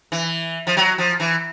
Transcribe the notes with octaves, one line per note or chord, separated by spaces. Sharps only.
E3
F3
F#3
F3
E3